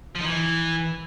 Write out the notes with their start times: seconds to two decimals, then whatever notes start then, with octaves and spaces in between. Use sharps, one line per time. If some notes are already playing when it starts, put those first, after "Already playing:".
0.15 F3
0.20 D#4
0.25 E3